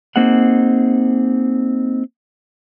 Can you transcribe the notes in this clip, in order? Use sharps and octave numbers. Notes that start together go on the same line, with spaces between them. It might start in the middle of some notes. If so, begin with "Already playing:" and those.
A#3 C4 D#4 G#4 F#5